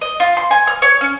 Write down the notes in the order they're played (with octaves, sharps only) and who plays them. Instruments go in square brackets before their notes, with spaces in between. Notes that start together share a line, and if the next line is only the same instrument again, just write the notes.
[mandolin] D#5
F4
C6
G#5
F6
C#5
C#4